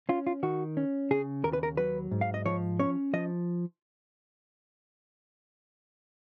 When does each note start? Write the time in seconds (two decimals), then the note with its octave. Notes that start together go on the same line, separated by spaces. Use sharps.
0.09 C#4 F4
0.27 F4
0.43 D#3 F#4
0.77 C#4
1.11 C#3 G#4
1.44 D#2 A#4
1.53 B4
1.63 A#4
1.77 F#3 B4
2.11 G#2
2.21 F5
2.34 D#5
2.46 F3 C#5
2.79 C#4 C#5
3.13 F3 D#5